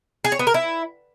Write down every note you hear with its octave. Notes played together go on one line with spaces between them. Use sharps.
G#4
C#5
B3
A#4
E4